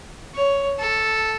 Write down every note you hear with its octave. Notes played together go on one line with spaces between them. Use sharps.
C#5
A4